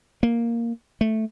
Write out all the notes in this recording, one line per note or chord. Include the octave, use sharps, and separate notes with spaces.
A#3
A3